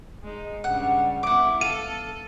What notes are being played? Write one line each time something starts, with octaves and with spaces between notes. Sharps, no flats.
G#3 D#4
G2 C#3 G3 F#5
B3 E4 F#5 D6
A4 F5 D#7